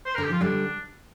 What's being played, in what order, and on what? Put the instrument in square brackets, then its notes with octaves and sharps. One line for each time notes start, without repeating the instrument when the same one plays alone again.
[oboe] C5
[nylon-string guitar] D3 [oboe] A#4
[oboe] G4
[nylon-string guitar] F3 [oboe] F4
[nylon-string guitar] D3 G3 [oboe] D4